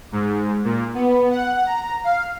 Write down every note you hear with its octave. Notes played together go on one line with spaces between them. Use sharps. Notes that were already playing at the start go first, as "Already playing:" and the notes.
G#2
A#2
B3
F#5
A#5
F5